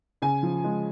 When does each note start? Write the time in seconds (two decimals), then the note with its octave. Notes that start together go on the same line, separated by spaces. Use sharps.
0.22 C#3 G#5
0.43 F3
0.64 G#3